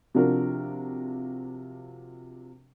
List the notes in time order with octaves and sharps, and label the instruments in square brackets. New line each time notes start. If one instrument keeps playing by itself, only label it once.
[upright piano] C3 F3 D4 F#4 A#4